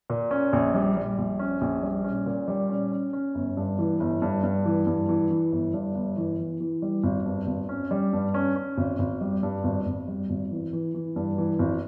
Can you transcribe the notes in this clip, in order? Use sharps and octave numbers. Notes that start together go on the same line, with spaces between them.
A#2
C#4
A#1
G3
G3
A#1
C#4
A#1
G3
C#4
A#2
G3
C#4
C#4
C#4
G1
G2
E3
G1
G2
G2
E3
G2
E3
E3
G1
G2
G1
E3
E3
E3
G3
G#1
G2
G#1
C#4
G3
G2
C#4
C#4
G#1
G#1
G3
G2
G#1
G#1
G3
G#1
E3
E3
E3
G2
E3
G#1